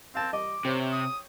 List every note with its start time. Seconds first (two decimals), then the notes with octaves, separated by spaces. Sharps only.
0.15 C4 F5 A5
0.33 G3 D#5 D6
0.65 C3 G4 C5 C#5
0.92 D#6